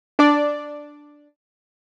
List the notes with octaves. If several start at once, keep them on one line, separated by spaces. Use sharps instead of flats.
D4 D5